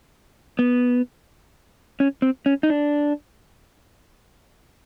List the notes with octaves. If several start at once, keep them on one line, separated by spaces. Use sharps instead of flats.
B3
C#4
C4
C#4
D#4
D4